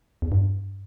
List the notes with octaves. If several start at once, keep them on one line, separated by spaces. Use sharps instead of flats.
E2
G2